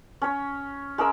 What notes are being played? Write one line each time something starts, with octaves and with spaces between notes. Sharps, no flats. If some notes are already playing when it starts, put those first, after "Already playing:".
C#4 C#5
G#3 C#4 A#4 E6